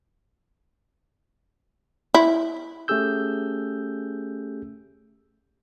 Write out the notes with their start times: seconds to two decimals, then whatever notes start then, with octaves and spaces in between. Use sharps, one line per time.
2.14 E4
2.88 A3 C#4 G4 G#4 E6 G6